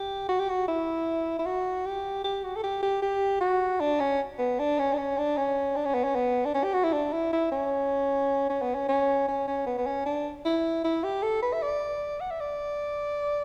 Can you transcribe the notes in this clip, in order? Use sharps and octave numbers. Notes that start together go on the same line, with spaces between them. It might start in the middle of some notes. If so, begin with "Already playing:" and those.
Already playing: G4
F#4
G4
F#4
E4
E4
F#4
G4
G4
F#4
A4
G4
G4
G4
F#4
D4
C#4
B3
D4
C#4
D4
C#4
D4
C#4
D4
C#4
B3
C#4
B3
D4
C#4
G4
F#4
E4
D4
E4
E4
C#4
C#4
B3
C#4
C#4
C#4
C#4
B3
B3
C#4
D4
E4
E4
G4
A4
B4
E5
D5
F#5
E5
D5